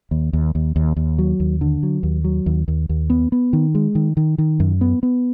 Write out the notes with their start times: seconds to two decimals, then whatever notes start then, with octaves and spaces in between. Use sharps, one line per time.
0.11 D#2
0.33 D#2
0.55 D#2
0.76 D#2
0.96 D#2
1.18 F#3
1.40 D#2
1.61 D3
1.83 F#3
2.03 D#2
2.24 F#3
2.46 D#2
2.68 D#2
2.89 D#2
3.10 B3
3.32 B3
3.53 D#3
3.75 G#3
3.95 D#3
4.17 D#3
4.38 D#3
4.60 F#2
4.81 B3
5.03 B3